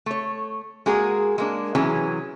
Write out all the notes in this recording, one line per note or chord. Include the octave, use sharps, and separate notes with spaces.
A3 C#5
G#3 A#3 F#4 G#4 A#4
G#3 A#3 D4
C3 E3 F#3 C#4 G#4